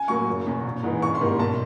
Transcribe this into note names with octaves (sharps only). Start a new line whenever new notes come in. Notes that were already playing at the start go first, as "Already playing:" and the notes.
Already playing: G#5
A2 F#3 A#3 C#6
F#1
E2 B2
A#1
G#2 E3 G#3
G#1 C#6
C6
G#2 D#3 G3 A#3
B1 A5